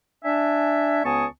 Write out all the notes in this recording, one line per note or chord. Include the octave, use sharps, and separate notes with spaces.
D4 E5 G#5
C#2 B3 G#5 A5 C#6 D#6